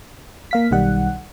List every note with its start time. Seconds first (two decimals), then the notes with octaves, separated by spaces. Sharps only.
0.51 A#3 F5 B6
0.71 B1 D#3 G3 F#5